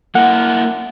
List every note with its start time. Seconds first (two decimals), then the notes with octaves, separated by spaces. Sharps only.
0.15 A#3 E4 F#5